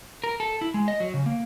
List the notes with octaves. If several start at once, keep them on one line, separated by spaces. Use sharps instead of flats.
A#4
A4
E4
G#3
D#5
F#3
C#3
A#3